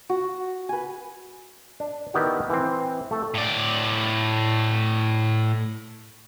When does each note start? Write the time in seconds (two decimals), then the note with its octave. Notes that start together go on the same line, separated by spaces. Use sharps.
0.10 F#4
0.69 B4 G#5
1.80 D4
2.14 D#3 B3 E4 F#4 G4
2.50 E3 C4
3.11 A3 A4
3.34 A2 D5